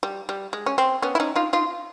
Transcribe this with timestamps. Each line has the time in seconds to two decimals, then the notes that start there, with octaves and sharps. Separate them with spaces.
0.03 G3
0.29 G3
0.53 G#3
0.66 C#4
0.78 C4
1.02 B3 C#4
1.15 E4
1.20 C#4 D#4
1.36 D#4 F4
1.53 D#4 F4